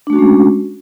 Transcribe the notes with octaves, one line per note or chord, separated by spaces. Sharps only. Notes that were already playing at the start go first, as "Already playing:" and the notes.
G#3 A3 C#4 D4 F#4